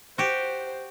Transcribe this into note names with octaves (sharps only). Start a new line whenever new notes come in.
F#4 G4 C5